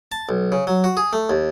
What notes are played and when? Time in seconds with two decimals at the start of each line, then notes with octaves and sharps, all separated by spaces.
0.12 A5
0.29 B1
0.52 C#3
0.67 F#3
0.84 F#4
0.97 G#4
1.13 A3
1.30 D#2